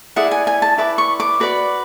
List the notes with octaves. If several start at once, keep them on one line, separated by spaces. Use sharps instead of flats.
E4 G#4 D5 F#5
G#5
G#5
A5
E4 B4 D5 D6
C#6
D6
F#4 B4 D5